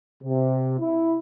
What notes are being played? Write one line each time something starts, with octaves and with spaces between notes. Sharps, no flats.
C3
E4